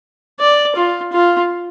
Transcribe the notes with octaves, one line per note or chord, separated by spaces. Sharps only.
D5
F4
F4